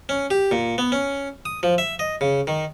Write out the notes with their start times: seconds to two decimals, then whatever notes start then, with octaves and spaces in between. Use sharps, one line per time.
0.09 C#4
0.31 G4
0.51 A#2
0.78 B3
0.92 C#4
1.45 D#6
1.63 F3
1.78 E5
1.99 D#5
2.21 C#3
2.47 D#3